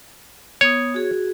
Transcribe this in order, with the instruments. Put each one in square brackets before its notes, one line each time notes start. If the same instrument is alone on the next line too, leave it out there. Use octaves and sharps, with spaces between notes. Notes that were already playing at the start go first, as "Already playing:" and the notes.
[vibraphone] B3 D#6 [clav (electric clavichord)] C#5
[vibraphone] F#4 G#4